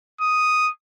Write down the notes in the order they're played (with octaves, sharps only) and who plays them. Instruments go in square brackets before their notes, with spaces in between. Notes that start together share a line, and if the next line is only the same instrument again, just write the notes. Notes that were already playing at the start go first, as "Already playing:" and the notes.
[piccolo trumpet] D#6